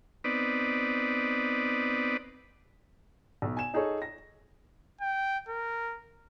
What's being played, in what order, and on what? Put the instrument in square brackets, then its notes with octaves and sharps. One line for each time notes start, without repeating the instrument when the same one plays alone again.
[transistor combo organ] B3 C4 D#4 B4 D5
[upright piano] B1
G#5 E7
D#4 G#4 A4 C#5
A#6
[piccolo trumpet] G5
A#4